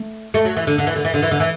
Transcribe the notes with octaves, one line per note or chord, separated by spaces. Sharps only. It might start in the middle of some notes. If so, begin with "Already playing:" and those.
Already playing: A3
A3
F#3
E3
D3
D3
E3
D3
E3
D3
E3
D3
E3